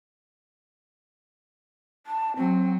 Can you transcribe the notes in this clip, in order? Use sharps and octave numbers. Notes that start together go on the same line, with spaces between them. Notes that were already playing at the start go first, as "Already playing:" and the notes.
A5
F#3 C4